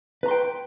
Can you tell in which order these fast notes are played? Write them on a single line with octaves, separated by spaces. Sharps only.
B4 A#5 C6 G5